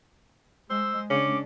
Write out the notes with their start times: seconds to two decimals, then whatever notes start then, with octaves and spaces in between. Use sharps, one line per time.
0.70 G#3 C5 E6
1.10 C#3 G#3 C#4 D4 D6